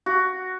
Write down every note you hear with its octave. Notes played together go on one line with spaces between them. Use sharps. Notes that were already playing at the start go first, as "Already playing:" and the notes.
F#4